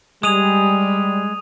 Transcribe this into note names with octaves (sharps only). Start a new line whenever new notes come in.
G3 G#3 G#4 D#6 D#7 F7